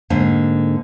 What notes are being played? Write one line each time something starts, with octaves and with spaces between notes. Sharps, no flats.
G#2 D3 A#3